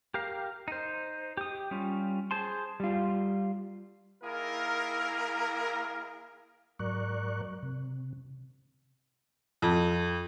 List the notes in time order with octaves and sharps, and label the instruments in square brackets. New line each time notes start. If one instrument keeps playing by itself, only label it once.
[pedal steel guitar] G4 A#4 F5
D#4 C5
G4 D#6
G3 C#4 F4
G#4 C5 A5 C6
[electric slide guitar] G3 F4
[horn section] D#3 A#3 E4 G#4 A#4
[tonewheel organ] G#2 F#3 A#4 D5 C#6 F#6
C3
[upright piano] F2